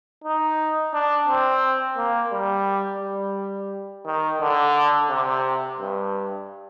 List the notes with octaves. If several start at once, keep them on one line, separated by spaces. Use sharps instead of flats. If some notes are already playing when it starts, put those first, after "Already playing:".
D#4
D4
C4
A#3
G3
G3
D#3
D3
C3
G2